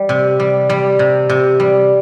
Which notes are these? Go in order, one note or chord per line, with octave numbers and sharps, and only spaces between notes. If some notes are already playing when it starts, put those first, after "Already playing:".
Already playing: G3
C3
G3
G3
C3
C3
G3